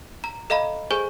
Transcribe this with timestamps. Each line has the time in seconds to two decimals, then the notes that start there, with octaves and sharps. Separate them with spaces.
0.24 A#5
0.50 A4 D#5 F5 A#5 B5
0.91 G#4 A4 C5 G#5 C#6 G6